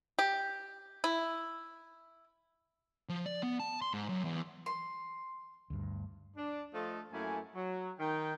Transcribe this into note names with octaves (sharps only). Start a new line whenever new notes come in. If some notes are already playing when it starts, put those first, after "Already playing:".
G4
E4
F3
D5
B3
A5
C6
G#2
F#2
E2
C6
D2 G2
D4
F3 A3 F4 A4 C5 D#5
F#2 A3 A#3 E4 G#5
F#3
D#3 G5